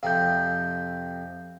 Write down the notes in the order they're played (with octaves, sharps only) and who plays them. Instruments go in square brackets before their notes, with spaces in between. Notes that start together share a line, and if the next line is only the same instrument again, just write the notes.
[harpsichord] F2 C3 C4 [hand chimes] F5 G6